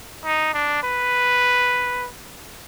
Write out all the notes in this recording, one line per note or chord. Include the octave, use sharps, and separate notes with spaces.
D#4
D4
B4